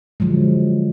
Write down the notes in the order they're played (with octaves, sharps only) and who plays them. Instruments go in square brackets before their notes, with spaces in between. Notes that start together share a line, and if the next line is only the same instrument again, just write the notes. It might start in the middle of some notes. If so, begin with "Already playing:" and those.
[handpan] D3 F3 F#3 G#3